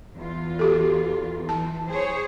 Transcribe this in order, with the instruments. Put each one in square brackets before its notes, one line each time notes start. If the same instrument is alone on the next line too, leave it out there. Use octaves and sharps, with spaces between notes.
[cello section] E2 F4
[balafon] F#4 G4 A4
[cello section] E3 [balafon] A5
[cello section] G#4 C5 C#5